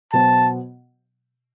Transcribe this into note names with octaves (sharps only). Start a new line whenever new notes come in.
B2 F#3 B3 F#4 C5 A5